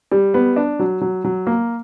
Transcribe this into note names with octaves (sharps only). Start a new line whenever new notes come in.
G3
B3
D4
F#3
F#3
F#3
A#3